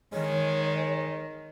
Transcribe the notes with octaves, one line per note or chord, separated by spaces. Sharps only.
D#3 G#3 C#5